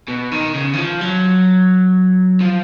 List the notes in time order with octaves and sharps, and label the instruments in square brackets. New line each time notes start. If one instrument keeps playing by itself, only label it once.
[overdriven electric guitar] B2
D#3
C#3
D#3
F3
F#3
F3